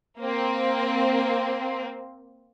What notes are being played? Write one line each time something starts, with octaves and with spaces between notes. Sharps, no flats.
A#3 C4